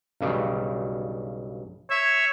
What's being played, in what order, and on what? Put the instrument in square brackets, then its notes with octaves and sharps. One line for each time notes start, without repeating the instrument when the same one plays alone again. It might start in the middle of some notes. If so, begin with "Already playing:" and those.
[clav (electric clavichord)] B1 G2 C#3
[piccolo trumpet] C#5 [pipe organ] E5